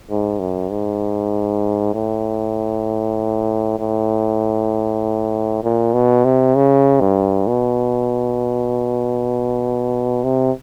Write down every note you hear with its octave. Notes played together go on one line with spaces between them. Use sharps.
G#2
F#2
G#2
A2
A2
A#2
B2
C3
C#3
G2
B2
C3